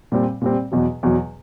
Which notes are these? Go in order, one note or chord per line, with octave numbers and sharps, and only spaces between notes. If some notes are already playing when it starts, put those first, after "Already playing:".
A#2 G3 C4
A#2 G3 C4
E2 B2 F#3
E2 B2 F#3